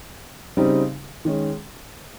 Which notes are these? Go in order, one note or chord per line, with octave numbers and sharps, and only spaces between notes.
C#3 G3 C4 D#4
D#3 G#3 C#4